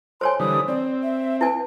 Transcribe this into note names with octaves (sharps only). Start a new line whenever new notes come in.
C5 C#5 G#5 C6
D3 E3 G3 D#6
C4 D5
E5
E4 B4 G#5